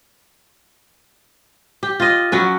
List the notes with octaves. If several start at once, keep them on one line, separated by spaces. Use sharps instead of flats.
G4
F4 D#5
F#3 C#4 B4